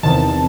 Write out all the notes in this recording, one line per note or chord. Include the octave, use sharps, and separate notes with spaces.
E2 C3 D#3 A5